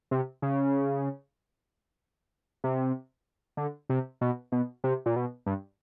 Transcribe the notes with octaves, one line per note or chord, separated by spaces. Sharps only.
C3
C#3
C3
D3
C3
B2
B2
C3
A#2
B2
G2